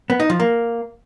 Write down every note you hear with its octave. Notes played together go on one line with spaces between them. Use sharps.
B3
D#4
F3
A#3